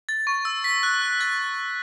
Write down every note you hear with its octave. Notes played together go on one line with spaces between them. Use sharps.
A6
C#6
E6
B6
F#6
F#6
A6